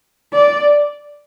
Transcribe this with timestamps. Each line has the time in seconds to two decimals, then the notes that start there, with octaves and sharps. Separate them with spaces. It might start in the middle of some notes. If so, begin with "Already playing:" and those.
0.33 D5